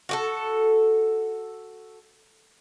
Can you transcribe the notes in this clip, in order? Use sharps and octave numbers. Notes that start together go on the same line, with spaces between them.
F#4 G4 A4